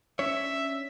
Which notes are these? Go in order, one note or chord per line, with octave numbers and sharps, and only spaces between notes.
C#4 D4 C#5 E5